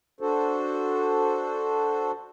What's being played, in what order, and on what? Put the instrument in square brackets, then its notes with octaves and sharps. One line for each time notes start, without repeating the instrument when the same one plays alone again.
[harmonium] D4 F#4 A4 C5